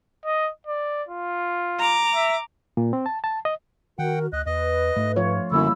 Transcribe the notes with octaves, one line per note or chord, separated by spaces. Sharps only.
D#5
D5
F4
A#5 D6
E5
A#2
C4
A5
A5
D#5
D#3 F#4 A#4 F#5 G5
D2 D#5 F#6
E2 B4 D#5
G#2 A3
F3 F4 C#5
F#2 D3 G3 A#3 E4 B5 E6